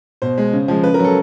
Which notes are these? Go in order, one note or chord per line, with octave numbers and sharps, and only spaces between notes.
B2 C5
G#3
C#3
F3 G#3
C#3 B4
A#4
F#3 A4